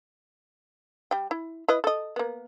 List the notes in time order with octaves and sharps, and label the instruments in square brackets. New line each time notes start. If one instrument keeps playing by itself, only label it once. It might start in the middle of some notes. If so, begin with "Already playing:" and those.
[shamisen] G3 G5
E4
E4 B4 D#5
A4 D#5
A#3 B3